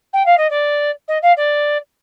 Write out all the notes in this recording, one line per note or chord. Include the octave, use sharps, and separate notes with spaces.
G5
F5
D#5
D5
D#5
F5
D5